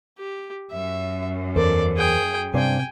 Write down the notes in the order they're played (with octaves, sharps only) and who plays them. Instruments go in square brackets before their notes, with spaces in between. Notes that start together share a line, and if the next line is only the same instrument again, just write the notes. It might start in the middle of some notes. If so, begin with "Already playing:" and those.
[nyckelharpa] G4
[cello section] F#2 [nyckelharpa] E5
[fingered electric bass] E2 [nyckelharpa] A4 D5 [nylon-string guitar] A#4 C5
[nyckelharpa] G#4 G5
[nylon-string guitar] G2 C5 D5 [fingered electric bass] C3 [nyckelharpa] G5 G#5